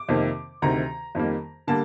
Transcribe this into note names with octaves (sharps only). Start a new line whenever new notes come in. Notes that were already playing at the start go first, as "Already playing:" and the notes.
Already playing: D6
F2 C3 D#3 A#3
D2 C3 D#3 A#5
F2 D#3 G3 A#3
D3 G3 A#3 A5